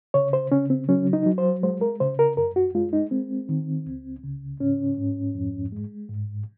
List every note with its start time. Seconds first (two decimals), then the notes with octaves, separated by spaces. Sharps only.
0.14 C#3 C#5
0.33 C5
0.52 C#3 C#4
0.70 C4
0.89 F#3 C#4
1.13 D#4
1.26 F#3
1.38 C5
1.63 G#3 C5
1.81 A#4
2.00 C#3 C5
2.19 A#4
2.37 F#2 A#4
2.56 F#4
2.75 G#3 F4
2.93 D#4
3.11 G#3 C4
3.49 D#3
3.86 C#2
4.23 C#3
4.60 G#2 C#4
4.98 G#2
5.35 F2
5.72 G#3
6.09 G#2